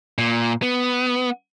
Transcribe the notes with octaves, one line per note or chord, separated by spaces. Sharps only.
A#2
B3